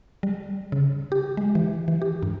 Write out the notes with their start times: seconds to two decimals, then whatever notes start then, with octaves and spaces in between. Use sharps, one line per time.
0.23 G3
0.72 C#3
1.12 G4
1.37 G#3
1.55 E3
1.88 E3
2.02 G4
2.23 G2